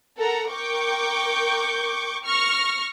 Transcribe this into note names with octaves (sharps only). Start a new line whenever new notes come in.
A4 A#4 F#5 A#5
A#4 G5 C#6 D6 G6
C#6 F6 A#6